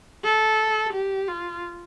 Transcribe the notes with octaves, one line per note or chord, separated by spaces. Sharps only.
A4
G4
F4